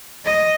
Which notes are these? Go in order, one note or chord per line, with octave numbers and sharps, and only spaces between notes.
D#5